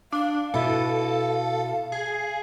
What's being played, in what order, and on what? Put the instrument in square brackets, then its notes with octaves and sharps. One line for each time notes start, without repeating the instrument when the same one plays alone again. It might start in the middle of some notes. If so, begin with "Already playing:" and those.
[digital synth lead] D4 [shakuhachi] F5
[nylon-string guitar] B2 E4 [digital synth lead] A4
[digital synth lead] G#4